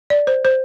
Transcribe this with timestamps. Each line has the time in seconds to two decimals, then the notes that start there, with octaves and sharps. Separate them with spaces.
0.10 D5
0.27 C5
0.45 C5